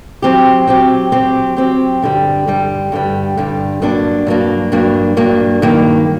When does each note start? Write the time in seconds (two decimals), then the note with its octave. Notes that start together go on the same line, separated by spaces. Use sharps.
0.22 F#3 C4 G4
0.67 F#3 C4 G4
1.12 F#3 C4 G4
1.57 F#3 C4 G4
2.02 G2 D3 G3
2.47 G2 D3 G3
2.92 G2 D3 G3
3.37 G2 D3 G3
3.82 G2 F#3 A#3 D4
4.27 G2 F#3 A#3 D4
4.72 G2 F#3 A#3 D4
5.17 G2 F#3 A#3 D4
5.62 G2 D#3 F#3 A#3